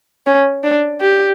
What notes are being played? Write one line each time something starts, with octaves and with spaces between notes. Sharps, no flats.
C#4
D4
G4